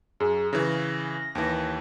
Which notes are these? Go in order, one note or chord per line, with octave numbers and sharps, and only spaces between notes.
F#2 G#4
C#3 E3 A#6
D#2 E3